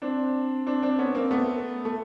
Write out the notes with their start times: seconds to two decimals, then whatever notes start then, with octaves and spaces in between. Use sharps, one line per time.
0.02 C4 D4
0.67 C4 D4
0.82 C4 D4
0.98 B3 C#4
1.15 A#3 C4
1.31 A3 B3
1.85 A3